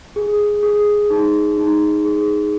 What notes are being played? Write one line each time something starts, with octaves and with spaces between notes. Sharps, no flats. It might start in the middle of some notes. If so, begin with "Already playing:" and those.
G#4
G#4
D#4
D#4
G#4